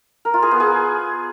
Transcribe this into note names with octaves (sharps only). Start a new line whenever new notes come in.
A#4
F4
G#4
B3
G#4